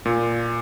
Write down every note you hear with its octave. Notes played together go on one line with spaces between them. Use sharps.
A#2